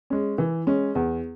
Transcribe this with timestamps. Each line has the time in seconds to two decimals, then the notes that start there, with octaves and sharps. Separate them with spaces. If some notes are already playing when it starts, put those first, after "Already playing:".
0.10 G#3 C#4
0.38 E3
0.67 G#3 C#4
0.95 E2